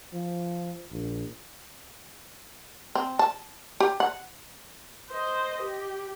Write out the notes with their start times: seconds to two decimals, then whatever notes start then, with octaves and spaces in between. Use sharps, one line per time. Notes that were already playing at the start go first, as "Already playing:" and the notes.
0.13 F3
0.92 A#1
2.95 C4
3.19 A5
3.80 G4
4.00 F#5
5.10 C5 D#5
5.61 G4